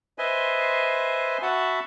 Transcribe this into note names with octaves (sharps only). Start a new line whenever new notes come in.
B4 C5 D#5 E5 G#5 C6
F#4 E5 F#5 A5 B5